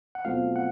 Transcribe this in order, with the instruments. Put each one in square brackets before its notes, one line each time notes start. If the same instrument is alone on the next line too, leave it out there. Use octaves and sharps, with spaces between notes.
[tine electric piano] F#5
[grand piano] B2 F#3 A3 C4 F4 [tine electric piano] F5
[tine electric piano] F#5